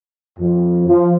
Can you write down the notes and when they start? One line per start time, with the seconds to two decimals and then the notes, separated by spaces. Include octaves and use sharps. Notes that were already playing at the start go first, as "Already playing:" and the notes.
0.39 F2
0.87 F3